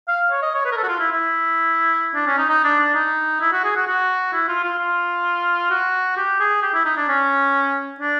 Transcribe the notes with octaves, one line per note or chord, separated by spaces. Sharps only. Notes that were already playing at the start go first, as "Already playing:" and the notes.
F5
C#5
D#5
C#5
B4
A#4
A4
F#4
F4
E4
E4
D4
C#4
D#4
D#4
D4
D4
D#4
E4
F#4
G#4
F#4
F#4
E4
F4
F4
F4
F#4
G4
G#4
G4
E4
D#4
D4
C#4
D4